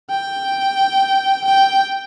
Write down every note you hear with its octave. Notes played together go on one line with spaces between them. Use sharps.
G5
G5